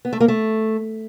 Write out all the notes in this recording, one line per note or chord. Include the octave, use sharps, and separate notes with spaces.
B3
A3
A#3
A3